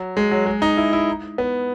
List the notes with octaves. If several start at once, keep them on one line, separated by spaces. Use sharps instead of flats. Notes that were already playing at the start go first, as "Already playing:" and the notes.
Already playing: F#3
G#3
F#3
G#3
D#4
E4
E4
B3